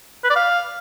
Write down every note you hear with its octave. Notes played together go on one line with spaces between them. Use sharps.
B4
D5
F5